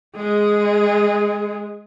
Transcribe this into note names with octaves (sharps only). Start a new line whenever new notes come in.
G#3 G#4